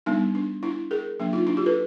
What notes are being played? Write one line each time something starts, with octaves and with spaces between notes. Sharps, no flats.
G3 B3 D4 D#4
D4
D4 E4
G#4 A#4
F#3 A#3 D4
D#4 F4
D4 E4
F4 G4
A4 B4